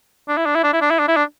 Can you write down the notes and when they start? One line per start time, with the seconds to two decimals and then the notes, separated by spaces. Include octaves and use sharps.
0.29 D4
0.37 E4
0.46 D4
0.55 E4
0.63 D4
0.73 E4
0.81 D4
0.90 E4
0.99 D4
1.08 E4
1.16 D4